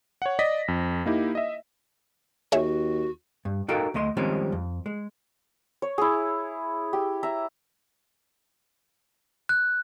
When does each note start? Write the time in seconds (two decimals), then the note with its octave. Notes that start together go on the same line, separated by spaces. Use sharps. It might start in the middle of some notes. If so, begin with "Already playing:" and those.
0.22 C#5 F#5
0.39 D5 D#5 A#6 B6
0.68 F2
1.06 A#3 D#4 E4 G4
1.35 D#5 E5
2.52 D#2 F#4 G#4 C#5 E5
3.45 G2
3.68 D#4 F#4 A4 A#4 F5 G5
3.94 D2 A3 D#5 C6
4.17 D#3 F3 G3 G#3 C4 C#4
4.52 F2
4.86 G#3
5.82 C#5
5.98 E4 G#4
6.93 G4
7.23 E5 A#5
9.49 F#6